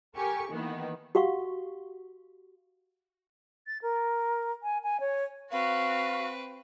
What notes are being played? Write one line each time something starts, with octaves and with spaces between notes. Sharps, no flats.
G4 A4 A#4 G#5 C#6
D#3 E3 A#3 B3
F#4 G4 F5 F#5 C#6
A6
A#4
G#5
G#5
C#5
C4 F#4 B4 F5